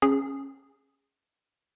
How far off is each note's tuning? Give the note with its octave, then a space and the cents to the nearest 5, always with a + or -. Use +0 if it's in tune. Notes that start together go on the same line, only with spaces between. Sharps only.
C#4 -15 G#4 +0